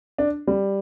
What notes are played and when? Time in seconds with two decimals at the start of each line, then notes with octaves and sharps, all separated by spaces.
0.18 D4
0.47 G3